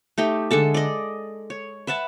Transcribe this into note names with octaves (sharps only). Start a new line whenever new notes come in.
A3 D#4 G4
D3 G#3 A4 A5
D5 D#5
C#5
B4 E5 F#5 A5